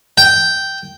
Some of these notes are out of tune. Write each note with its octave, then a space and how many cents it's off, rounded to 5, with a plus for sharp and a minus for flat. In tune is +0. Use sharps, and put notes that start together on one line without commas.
G5 -5